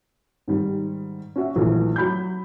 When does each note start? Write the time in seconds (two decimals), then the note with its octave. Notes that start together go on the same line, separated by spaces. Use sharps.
0.48 G#2 D#3 G3
1.36 C#4 F#4 E5
1.56 A#1 D#3 E3 F#3 A3
1.96 F#3 B5 G6